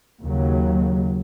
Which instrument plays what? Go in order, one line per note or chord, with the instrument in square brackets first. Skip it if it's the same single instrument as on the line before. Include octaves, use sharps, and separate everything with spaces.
[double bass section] D#2 C#3 F#3